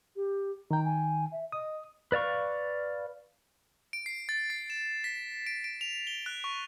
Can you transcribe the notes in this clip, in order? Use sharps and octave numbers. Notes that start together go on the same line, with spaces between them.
G4
D#3 G5 A#5
G#5
E5
D#5 D#6
B4 D5 F5 C#6
D7
C7
A6
C7
E7
B6
D7
D7
F7
G7
F#6
C#6